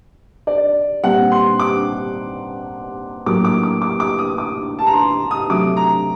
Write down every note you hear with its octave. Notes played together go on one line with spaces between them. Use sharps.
D5
A#2 G3 C4 F#5
C6
D6
A2 F#3 A#3 D6
D6
D6
D6
D6
D#6
D6
A5
A#5
C6
D#6
C3 F#3 A3 D6
A#5